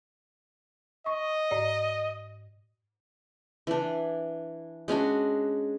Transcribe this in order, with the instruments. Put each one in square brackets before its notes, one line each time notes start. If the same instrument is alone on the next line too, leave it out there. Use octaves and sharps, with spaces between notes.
[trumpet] D#5 [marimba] C#6
[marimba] G#2 D5
[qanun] E3 D4
G#3 C#4 D4 F#4